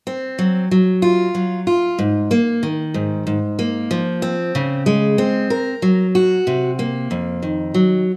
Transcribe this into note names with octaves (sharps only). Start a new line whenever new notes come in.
C4
F#3
F#3
F4
F#3
F4
G#2
A#3
D#3
G#2
G#2
A#3
F3
C4
C#3
G#3
C4
A#4
F#3
F#4
C3
A#3
F2
D#3
F#3